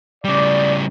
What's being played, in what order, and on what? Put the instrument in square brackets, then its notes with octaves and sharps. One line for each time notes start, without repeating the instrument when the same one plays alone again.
[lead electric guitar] C#3 G3 [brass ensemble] D5